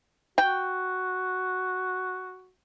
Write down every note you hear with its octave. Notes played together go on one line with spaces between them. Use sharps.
F#4 G5